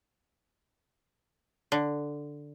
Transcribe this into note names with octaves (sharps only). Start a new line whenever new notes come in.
D3